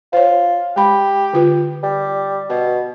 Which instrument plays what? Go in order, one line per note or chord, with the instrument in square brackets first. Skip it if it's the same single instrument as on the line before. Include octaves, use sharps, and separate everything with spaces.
[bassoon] F4 [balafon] C5 C#5
[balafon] G#3 B5 [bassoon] G4
[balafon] D3 F4 B4
[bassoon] G3
[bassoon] B2 [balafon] B4